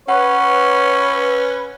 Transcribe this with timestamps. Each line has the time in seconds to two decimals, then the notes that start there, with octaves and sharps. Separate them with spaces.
0.08 C#4 B4 C#5 F#5